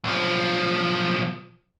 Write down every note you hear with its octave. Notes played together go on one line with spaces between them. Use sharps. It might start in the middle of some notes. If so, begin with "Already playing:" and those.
B1 F3